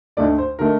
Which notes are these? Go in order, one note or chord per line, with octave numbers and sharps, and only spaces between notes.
D2 D3 A3 D#4 D5
C5
D3 A3 D#4 A#4